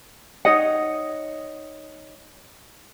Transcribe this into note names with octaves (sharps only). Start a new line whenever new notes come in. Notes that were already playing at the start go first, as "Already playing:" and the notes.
D#4 C#5 D#5 F#5